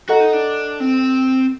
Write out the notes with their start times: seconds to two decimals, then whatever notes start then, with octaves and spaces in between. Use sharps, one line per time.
0.09 F#4 A4 D#5 F#5 A#5 F#6
0.20 D#4
0.33 D4
0.80 C4